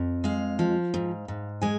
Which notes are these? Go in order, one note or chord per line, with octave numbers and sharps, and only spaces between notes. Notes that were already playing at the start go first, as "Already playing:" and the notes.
Already playing: F2
G#3 F5
F3
G#2
G#2
G#3 G#5